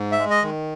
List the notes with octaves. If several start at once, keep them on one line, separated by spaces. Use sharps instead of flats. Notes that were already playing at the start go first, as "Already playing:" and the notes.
Already playing: G#2
E5
G#3
D#5
D#3